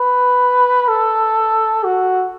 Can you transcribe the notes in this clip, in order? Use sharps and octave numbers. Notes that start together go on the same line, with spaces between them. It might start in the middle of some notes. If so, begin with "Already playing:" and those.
Already playing: B4
A4
F#4